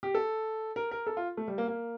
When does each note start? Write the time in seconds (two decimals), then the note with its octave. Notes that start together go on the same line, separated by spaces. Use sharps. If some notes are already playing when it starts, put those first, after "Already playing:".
0.03 G4
0.15 A4
0.76 A#4
0.91 A#4
1.07 A4
1.17 F4
1.37 A3
1.48 G3
1.58 A#3
1.68 A#3